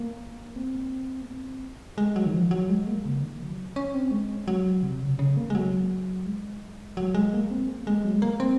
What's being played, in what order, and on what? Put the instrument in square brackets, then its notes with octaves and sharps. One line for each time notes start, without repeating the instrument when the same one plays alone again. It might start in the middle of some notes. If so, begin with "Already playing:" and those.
Already playing: [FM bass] A#3
C4
A#3
C4
G#3
F#3
D#3
F3
F#3
G#3
A#3
C#3
D#3
F#3
C#4
C4
G#3
F#3
C3
C#3
C#3
A#3
G#3
F#3
G#3
F#3
G#3
A#3
C4
A#3
G#3
F#3
G#3
A#3
C4